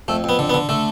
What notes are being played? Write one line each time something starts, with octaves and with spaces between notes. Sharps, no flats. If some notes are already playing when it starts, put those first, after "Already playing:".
F2 A3
F2 B3
D3
B3
D3
D3 A3